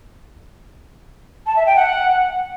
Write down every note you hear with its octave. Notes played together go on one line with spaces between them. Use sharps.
A5
E5
G5
F#5